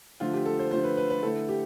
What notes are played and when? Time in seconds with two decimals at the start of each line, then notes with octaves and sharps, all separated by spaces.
0.20 D3 F3 A3 F4
0.34 G4
0.46 A4
0.59 C5
0.71 D3 F3 A3 C5
0.84 B4
0.97 B4
1.10 B4
1.23 D3 A3 E4 A4
1.49 G4